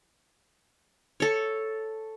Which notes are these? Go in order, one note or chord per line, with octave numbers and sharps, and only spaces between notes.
A4 C#5